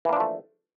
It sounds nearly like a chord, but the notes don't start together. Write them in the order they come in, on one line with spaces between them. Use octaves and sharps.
E3 A#3 D4 F3 A3